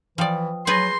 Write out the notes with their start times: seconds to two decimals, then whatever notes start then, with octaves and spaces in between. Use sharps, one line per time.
0.18 E3 F3 B4 D5 G5 D#6
0.67 F#3 G#4 B4 C6 G6 A6 A#6